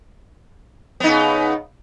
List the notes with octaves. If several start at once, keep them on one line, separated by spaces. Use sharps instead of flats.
C#3 B3 D#4